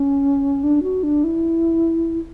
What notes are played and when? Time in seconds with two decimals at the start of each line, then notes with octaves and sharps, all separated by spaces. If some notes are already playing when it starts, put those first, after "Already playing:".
Already playing: C#4
0.63 D4
0.83 F#4
1.03 D4
1.24 E4